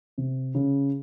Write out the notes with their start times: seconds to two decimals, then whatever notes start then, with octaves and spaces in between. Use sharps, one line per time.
0.18 C3
0.55 C#3